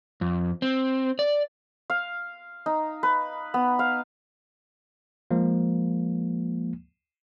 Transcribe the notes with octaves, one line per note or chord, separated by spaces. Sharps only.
F2
C4
D5
F5
D#4
B4
B3
F5
F3 G#3 A#3